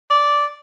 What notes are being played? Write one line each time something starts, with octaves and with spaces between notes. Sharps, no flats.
D5